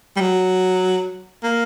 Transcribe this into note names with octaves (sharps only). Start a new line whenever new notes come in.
G3
F#3
A#3